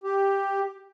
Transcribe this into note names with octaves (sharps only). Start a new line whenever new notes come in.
G4